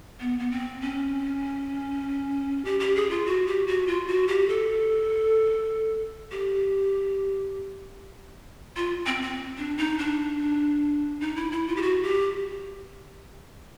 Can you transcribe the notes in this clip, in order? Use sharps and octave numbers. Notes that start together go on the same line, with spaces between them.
B3
B3
C4
C#4
G4
G4
G#4
F4
F#4
G4
F#4
F4
F#4
G4
A4
G4
F4
C4
C4
D4
D#4
D4
D#4
E4
E4
F4
G4
F#4
G4